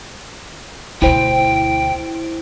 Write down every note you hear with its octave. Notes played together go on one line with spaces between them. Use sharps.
D2 B2 E4 C5 G5